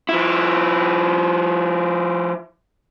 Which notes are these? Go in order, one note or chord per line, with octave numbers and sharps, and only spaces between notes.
F3 E4